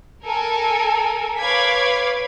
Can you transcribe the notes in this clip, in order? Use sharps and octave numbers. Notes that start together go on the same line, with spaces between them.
A4 A#4 G#5
B4 C#5 F5 D6 G#6 B6